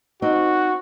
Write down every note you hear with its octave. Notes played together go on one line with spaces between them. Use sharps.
C4 D#4 F#4